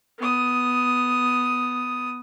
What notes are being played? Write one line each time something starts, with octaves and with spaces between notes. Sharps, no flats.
B3 D#6